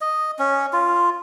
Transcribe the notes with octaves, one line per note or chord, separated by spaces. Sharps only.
D#5
C#4
F4